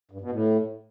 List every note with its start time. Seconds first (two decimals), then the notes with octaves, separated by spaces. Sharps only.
0.11 G2
0.21 B2
0.31 A2